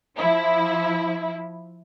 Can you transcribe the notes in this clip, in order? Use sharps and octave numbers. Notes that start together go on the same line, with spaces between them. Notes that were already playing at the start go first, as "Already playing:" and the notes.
F3 E4